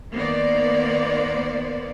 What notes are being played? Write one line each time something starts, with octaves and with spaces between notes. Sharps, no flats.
D#3 A#3 B3 C5 D5